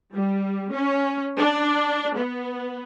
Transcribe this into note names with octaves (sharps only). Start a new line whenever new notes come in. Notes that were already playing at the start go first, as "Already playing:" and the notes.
G3
C#4
D4
B3